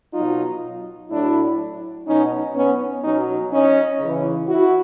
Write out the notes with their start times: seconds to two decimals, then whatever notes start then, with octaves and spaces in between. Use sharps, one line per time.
0.13 B2 F#3 D#4 F4
1.10 A2 F#3 D4 E4
2.07 B2 F#3 C#4 D#4
2.55 B3 C#4
3.03 B2 F#3 C#4 D#4
3.52 C#4 D#4
4.00 C#3 E3
4.48 E4 F#4